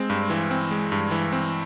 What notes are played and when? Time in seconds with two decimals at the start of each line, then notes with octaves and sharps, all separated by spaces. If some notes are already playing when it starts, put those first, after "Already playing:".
Already playing: G#3 C4
0.10 G2
0.30 E3
0.51 C4
0.71 G#3
0.92 G2
1.11 E3
1.32 C4